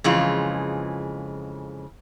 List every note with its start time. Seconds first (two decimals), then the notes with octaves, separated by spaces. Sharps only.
0.04 F2 C#3 E3 G#3 F4